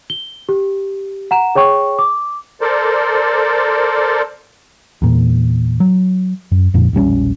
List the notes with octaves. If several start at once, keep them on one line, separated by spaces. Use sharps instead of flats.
G7
G4
F#5 A#5 E7
G#4 C#5 G5 C#6
D6
A4 A#4 C5 D5
E2 A#2
F#3
F#2
F2 A#2 F3
E1 A#1 G3 C#4